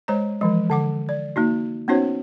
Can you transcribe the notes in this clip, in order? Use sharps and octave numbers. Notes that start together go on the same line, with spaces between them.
G#3 C5 C#5 A#5
E3 F3 G#3
D3 F#5 D6
D5
A#3 D#4 F#4
B3 C#4 D#4 F#4 C5 C#5